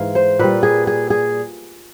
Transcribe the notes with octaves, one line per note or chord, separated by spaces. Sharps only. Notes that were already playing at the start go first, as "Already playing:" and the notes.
Already playing: G#2 E3 G#3 F5
C5
A#2 G3 B4
G#4
G#4
G#4